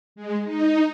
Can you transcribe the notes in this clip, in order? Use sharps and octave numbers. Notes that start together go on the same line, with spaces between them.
G#3
D#4